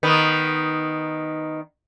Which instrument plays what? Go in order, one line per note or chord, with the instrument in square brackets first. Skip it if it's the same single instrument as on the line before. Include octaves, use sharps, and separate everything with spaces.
[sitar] D#3 B3